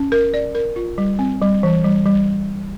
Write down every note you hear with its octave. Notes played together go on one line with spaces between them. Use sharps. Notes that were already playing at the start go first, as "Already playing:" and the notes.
Already playing: C#4
A#4
D5
A#4
F4
G3
C4
G3
E3
G3
G3